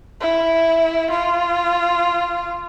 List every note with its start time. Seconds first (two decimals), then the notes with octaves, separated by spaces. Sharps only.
0.20 E4
1.11 F4